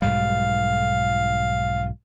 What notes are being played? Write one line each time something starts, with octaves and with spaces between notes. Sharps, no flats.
B1 G#2 G3 F5